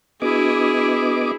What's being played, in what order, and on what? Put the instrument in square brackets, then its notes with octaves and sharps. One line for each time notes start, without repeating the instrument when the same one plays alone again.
[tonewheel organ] B3 D#5 D6 [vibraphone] D4 F#4 [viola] E4 G#4